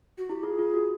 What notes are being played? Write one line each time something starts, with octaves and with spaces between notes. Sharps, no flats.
F#4
E4 G4
F4 G#4
F4
F#4